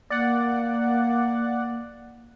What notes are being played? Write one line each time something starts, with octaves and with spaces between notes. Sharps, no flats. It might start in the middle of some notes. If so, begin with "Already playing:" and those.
A#3 D5 F#5